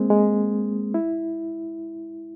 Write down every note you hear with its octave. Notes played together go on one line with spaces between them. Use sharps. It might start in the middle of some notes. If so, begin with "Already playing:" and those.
Already playing: G#3 A#3 C4
G#3
E4